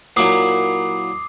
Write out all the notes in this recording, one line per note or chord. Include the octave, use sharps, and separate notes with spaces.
A#2 F#3 E4 D6 D#6 C7